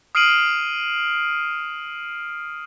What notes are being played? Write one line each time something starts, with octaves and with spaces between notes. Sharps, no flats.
D#6 F6 C7 D7 D#7 F#7